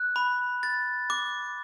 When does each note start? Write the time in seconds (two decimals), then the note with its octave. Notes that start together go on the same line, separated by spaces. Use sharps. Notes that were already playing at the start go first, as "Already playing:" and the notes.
Already playing: F#6
0.16 B5
0.63 A6
1.10 D6